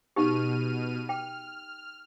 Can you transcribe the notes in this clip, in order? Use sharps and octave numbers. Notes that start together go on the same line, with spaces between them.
B2 D#4 G4 F6 D#7
G5 F6